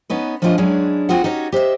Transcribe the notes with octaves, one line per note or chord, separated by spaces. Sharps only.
B3 C#4 D#4 B4
F3 A3 C#4 D4 F4 D#5
F#3 G#3 C#4 D4 E4 G#4
C4 F4 F#4 G#4 F#5
C#4 D#4 F#4 G4 B4 C#5
G4 C5 D#5 E5